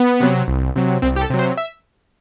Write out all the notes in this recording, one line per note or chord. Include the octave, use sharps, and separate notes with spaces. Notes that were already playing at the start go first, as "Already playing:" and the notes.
Already playing: B3
C3 F#3
C2
C3 F#3
C2 C4
G4
A4
C3 F#3
C5
E5